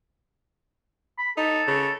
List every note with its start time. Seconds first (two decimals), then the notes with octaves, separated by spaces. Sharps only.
1.18 B5
1.37 D#4 A4
1.68 C#3